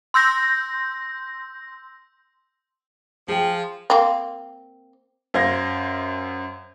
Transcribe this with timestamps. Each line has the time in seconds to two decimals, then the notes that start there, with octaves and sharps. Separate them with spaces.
0.14 C6 E6 G6 A#6
3.28 F3 G#4 G5
3.90 A#3 C4
5.34 F#2 C5 F5 G#6 A#6